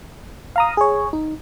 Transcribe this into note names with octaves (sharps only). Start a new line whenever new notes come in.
F5 A#5 D#6
G#4 C#5
D#4